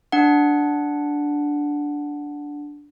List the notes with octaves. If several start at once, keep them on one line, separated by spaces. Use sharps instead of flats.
D4 F#5